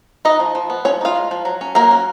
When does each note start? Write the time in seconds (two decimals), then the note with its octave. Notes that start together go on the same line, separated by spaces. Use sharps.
0.25 B3 D#4 D#5
0.40 F3
0.55 F3
0.70 B3
0.85 F3 C#4 C#5
1.01 D#4 F4 F5
1.15 G#3
1.31 F3
1.45 F#3
1.61 C#4
1.75 F#3 A#3 A#4
1.91 C#4